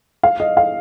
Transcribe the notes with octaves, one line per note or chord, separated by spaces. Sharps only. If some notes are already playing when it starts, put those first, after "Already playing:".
F5
D#5
F5